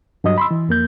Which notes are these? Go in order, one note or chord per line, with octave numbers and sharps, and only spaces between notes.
G2 F#3 D#5 D#6
B5 C6 E6
E3
F2 A#3 G6